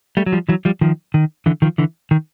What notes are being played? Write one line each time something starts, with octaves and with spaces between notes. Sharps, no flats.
G3 A3
F#3
F3 G3
E3 F#3
F3 G3
D#3 F3
D#3
D3 E3
D#3 F3
D3 E3
D#3